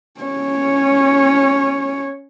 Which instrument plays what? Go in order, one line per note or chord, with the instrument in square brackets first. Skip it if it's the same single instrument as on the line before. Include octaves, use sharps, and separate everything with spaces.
[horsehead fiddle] C#4 C#5